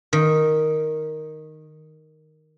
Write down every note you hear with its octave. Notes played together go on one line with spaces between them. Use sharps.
D#3